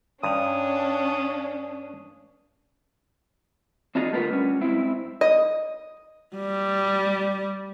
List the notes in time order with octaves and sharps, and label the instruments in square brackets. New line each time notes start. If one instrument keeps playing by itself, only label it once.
[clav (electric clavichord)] G2 [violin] C#4 D4 [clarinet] D#6
[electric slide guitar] C4 D4 D#4 F4 G4 G#4
D3 A3 B3 F4 A#4 B4
G3 C#4
G#2 C4 E4
[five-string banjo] D#5
[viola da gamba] G3